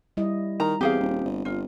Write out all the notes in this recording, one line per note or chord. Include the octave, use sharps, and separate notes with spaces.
G3 E4 D#5
D#3 A#5
E2 C4 G4 G#4 F5
D#1
G1
G1 F4